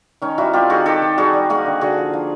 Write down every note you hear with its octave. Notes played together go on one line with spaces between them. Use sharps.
D#3 C#4 D#4
G3 E4 F#4
C4 F4 G4
D#3 F#4 G#4
D#3 G4 A4
D#3
G3 F#4 G#4
G3
A#3 F#4 G#4
D3
D3 F#4 G#4
F3
F3